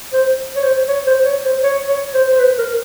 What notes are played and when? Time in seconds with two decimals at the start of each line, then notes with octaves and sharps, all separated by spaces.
0.13 C5
0.56 C#5
0.63 C5
0.88 C#5
1.07 C5
1.25 C#5
1.45 C5
1.63 C#5
1.89 C#5
2.14 C5
2.32 C5
2.39 B4
2.58 A#4